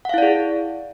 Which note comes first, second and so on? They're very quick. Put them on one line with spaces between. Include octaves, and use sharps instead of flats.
F#5 F5 E4 D5 G#4